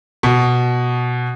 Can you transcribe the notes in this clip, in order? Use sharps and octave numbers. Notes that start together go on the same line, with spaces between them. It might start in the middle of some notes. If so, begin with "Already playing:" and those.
B2